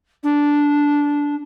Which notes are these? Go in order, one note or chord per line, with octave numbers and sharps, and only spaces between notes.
D4